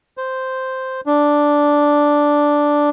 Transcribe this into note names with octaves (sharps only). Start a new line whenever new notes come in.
C5
D4